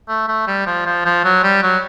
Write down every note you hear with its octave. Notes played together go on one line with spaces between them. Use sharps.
A3
A3
G3
F3
F3
F3
F#3
G3
F#3